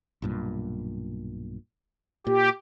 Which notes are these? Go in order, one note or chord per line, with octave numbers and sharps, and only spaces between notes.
B1 G2 A#2
A#2 G4